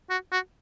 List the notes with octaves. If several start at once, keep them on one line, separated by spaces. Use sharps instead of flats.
F#4
F#4